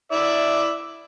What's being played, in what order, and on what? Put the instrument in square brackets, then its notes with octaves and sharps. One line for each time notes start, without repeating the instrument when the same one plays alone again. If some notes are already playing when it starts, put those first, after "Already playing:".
[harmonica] E4 D5 E5